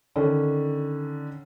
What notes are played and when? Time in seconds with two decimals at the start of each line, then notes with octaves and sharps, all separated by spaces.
0.16 D3 D#3 C#4